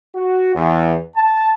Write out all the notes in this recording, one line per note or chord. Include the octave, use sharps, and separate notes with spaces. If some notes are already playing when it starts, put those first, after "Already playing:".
F#4
E2
A5